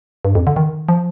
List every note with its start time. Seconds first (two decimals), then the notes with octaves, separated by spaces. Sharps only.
0.25 G2
0.35 F2
0.47 D3
0.56 D#3
0.89 F3